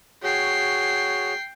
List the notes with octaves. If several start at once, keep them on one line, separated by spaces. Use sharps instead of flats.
F#4 G#4 C#5 G5 C7